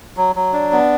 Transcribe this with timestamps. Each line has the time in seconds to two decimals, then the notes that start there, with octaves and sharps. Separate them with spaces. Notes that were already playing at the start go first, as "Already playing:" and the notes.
0.17 F#3
0.36 F#3
0.53 D4
0.72 B3